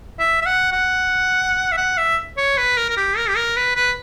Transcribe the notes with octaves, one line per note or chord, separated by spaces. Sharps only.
E5
E5
F#5
F#5
E5
F#5
E5
C#5
B4
A#4
A#4
G4
A#4
G4
A#4
B4
B4